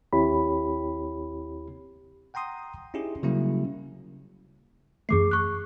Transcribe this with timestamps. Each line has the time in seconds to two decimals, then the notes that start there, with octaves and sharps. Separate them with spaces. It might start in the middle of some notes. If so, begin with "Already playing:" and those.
0.13 D#2 C4 E4 G4 C#5 B5
2.34 F#5 G5 A#5 C6 D#6
2.94 C#4 D#4 E4 G4 G#4
3.23 C#3 F#3 G3 A#3 C#4 E4
5.09 F#2 E3 A3 G#4 D6 C7
5.31 C#6 F#6